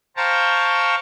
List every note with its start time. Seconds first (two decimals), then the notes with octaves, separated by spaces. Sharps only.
0.17 C5 F5 G5 A5 A#5 C#6